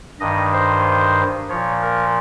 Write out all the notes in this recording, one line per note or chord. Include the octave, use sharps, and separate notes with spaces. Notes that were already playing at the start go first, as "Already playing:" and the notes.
G2 D#3 D#5
C5
A#2 F3 C#5
A#4